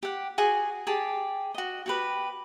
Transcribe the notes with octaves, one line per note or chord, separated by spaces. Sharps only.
G4 F#5
F#4 G#4 G#5
G4 G#4 A5
F#4 D#5
F#4 G4 B4